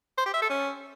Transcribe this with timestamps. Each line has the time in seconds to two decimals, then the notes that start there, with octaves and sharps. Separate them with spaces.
0.18 C5
0.26 G4
0.34 E5
0.42 A4
0.50 C#4